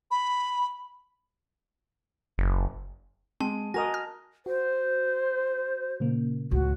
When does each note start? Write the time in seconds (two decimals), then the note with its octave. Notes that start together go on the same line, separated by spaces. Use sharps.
0.11 B5
2.38 F#1
3.40 G#3 C4 A5
3.74 F#4 A#4 D#5 G#5 D#6 A#6 F7
3.94 F6
4.46 F#4 C5
6.00 A#2 C#3 A#3
6.51 C#2 A2 F#4